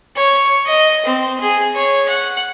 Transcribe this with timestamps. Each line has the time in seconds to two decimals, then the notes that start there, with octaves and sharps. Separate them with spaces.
0.17 C#5
0.67 D#5
1.05 C4
1.41 G#4
1.75 C#5
2.09 F#5